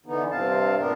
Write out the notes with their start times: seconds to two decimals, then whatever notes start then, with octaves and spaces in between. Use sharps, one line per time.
0.06 D3 E3 B3 D#4
0.31 G2 C3 C4 F5 A5
0.77 A#2 B3 D4 A#4